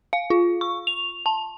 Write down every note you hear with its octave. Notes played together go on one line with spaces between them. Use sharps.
F5
F4
C#6
F7
A5